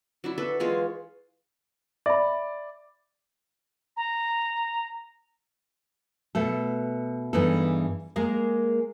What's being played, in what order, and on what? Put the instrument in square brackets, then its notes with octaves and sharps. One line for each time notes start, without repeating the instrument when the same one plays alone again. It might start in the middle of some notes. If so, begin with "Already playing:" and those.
[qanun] F#3 D4 E4
A4 B4 E5
E3 G#3 F4 C#5
[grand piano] D5 [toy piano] E5 B5
[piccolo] A#5
[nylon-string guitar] B2 A3 A4
G2 E3 B3 D#4 G#4 A4
G#3 A#3 G#4 A#4